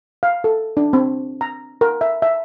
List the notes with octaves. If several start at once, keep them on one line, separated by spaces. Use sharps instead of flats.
F5
A4
D4
C4
A#5
A#4
E5
E5